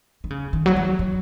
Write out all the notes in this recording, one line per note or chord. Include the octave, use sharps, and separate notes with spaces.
D#3
C#3
D#3
F#3
E3
F#3